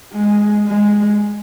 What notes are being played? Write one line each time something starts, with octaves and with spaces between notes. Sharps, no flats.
G#3
G#3